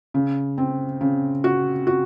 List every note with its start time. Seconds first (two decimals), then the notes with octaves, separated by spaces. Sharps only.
0.14 C#3
0.58 C4
1.01 C#3
1.44 F#4
1.87 F#4